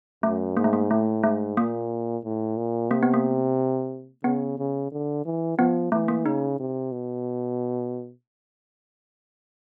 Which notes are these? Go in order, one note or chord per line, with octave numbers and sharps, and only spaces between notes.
F#2 A3
G#2 A#3
A3
A#3
A2 A3
G#2 A3
A#2 A#3
A2
A#2
C3 A#3
B3
A#3
C#3 B3
C#3
D3
E3
F3 B3
E3 A3
A#3
C#3 D#4
C3
B2